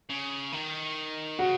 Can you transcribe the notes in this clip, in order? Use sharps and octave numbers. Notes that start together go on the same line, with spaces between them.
C#3
D#3
C#3 F#4